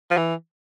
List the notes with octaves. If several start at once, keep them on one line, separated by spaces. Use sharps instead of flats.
F3
E3